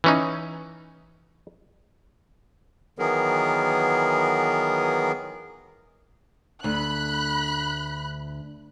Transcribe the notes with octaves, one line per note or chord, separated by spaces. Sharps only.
E3 C#4 D#4
D#3 E3 F#3 B3 G#4 A#4
D2 B5 F#6